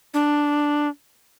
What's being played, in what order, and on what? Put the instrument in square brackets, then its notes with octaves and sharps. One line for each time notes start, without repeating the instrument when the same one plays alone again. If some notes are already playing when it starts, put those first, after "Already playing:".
[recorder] D4